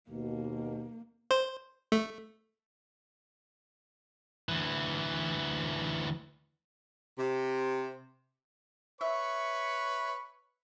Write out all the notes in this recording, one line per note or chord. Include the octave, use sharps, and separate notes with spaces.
D#2 B2 A#3
C5
A3
D2 E3
C3
B4 C#5 E5 C#6